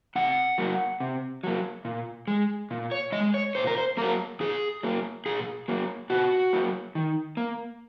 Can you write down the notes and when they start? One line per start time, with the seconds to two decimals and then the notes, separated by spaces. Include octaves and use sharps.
0.16 C3 F#5
0.58 F#3 A#3
1.00 C3
1.44 F#3 A#3
1.85 A#2
2.27 G#3
2.71 A#2
2.92 C#5
3.12 G#3 D#5
3.34 C#5
3.55 A#2 C5
3.67 A#4
3.78 C5
3.97 F#3 A#3 A#4
4.40 A#2 G#4
4.83 F#3 A#3
5.26 A#2 G#4
5.68 F#3 A#3
6.10 A#2 F#4
6.53 F#3 A#3
6.95 D#3
7.37 A#3